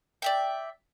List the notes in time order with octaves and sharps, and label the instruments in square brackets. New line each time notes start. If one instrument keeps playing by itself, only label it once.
[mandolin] D5 E5 G5